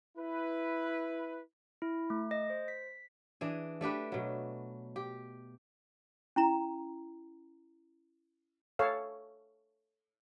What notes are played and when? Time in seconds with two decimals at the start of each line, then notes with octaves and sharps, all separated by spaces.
0.17 E4 B4
1.82 E4
2.10 A3
2.31 D#5
2.50 C5
2.68 B6
3.41 E3 D4 G#4
3.81 A3 D4 G4 B4
4.12 B2 F#3
4.96 G4
6.36 C#4 E4 A#5
8.79 A4 C#5 F5